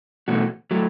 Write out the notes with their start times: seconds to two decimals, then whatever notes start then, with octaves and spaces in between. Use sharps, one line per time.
0.28 E2 B2 A3 F#4
0.71 F#3 A3